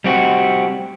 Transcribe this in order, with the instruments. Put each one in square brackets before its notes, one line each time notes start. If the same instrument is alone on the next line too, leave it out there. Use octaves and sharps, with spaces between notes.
[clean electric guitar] G3 C4 F#4